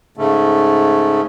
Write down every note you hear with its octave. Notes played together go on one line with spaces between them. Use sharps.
G#2 C#3 A3